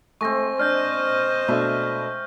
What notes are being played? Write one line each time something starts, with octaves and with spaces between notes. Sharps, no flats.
G#3 A3 C4 C#6 A#6
D4 C5 D#5 F6 G6
B2 A3 D4 E5